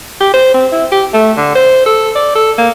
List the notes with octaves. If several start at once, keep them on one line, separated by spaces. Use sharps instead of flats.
G4
C5
C4
E4
G4
A3
D3
C5
A4
D5
A4
A#3